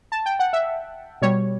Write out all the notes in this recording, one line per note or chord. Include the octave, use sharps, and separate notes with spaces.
A5
G5
F#5
E5
B2 G3 C#5